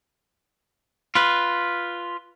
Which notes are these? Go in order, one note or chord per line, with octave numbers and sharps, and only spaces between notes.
F4 B4